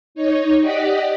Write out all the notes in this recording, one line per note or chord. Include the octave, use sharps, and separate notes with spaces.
D#4 C#5
G4 D5 D#5 F#5 B6